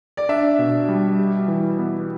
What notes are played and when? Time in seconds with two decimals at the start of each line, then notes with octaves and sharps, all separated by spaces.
0.17 D5
0.29 D4 E5
0.59 B2
0.89 G3
1.19 G4
1.48 E3
1.79 B3